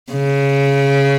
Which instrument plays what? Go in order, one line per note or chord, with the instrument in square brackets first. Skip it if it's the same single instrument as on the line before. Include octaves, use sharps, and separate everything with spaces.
[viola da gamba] C#3